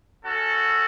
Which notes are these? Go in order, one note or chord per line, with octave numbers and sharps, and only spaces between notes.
C#4 F#4 A4